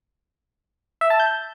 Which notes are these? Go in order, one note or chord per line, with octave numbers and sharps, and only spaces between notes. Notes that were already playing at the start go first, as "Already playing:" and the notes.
E5
A5
G6